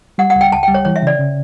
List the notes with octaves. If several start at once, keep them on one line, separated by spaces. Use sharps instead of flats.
G3 F#5
F#5
C#2
G5
C#2 A5
G5
G3
C#5
E3 C#5
E5
C#3 D5
C#3